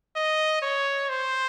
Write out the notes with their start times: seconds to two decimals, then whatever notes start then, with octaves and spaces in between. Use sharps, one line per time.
0.16 D#5
0.62 C#5
1.09 C5